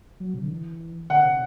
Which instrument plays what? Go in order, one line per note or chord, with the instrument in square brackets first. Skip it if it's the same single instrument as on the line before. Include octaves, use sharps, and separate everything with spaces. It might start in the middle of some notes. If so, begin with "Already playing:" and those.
[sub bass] F#3
C3
D3
E3
[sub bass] D3 [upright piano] F#5
[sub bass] C3